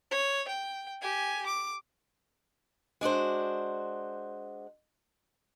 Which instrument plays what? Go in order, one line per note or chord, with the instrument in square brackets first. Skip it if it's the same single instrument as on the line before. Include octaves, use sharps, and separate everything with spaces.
[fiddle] C#5
G5
G4 G#5
D6
[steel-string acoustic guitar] G#3 D4 F#4 C5